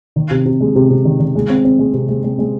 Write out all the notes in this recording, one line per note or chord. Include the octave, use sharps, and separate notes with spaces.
D#3
C3
C3
G#3
C3
C3
D#3
D#3
G#3
C4
C4
G#3
C3
G#3
G#3
G#3